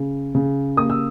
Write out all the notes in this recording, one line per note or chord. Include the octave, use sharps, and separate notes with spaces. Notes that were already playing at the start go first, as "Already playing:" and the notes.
Already playing: C#3
C#3
A#3 D#6
E6